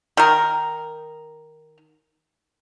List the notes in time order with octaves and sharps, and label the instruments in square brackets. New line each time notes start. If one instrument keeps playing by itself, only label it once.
[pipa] D#3 A#4